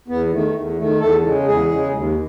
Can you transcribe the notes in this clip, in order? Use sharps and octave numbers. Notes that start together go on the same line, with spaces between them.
E2 B3
D#3 A3
E2
D#3 A3
E2 A4
C#3 G#3
E2 G#4
C#3 G#3
D#2